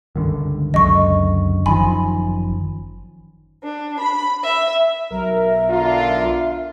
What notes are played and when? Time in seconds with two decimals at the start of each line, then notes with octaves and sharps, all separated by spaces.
0.16 G1 C#2 D3 D#3
0.74 F#1 C#2 F#2 D3 D#5 C#6
1.66 G1 F#2 D#3 F3 G#5 B5 C6
3.63 D4
3.98 B5
4.43 E5
5.10 B1 A#4 E5
5.70 D3 D4 F4